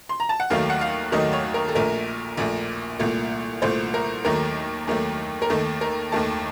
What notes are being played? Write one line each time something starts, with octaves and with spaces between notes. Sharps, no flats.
C6
A#5
A5
F#5
D#2 D#3 F#3 A3 F5
F#5
F5
D#2 D#3 F#3 A3 D#5
C#5
A#4
A4
A#1 A#2 A3 A#4
A#1 A#2 A3
C2 A#2 A3
C2 A#2 A3 C5
A#4
D#2 D#3 F#3 A3 A#4
D#2 D#3 F#3 A3
A#4
D#2 D#3 A3 A4
A#4
D#2 D#3 A3 A5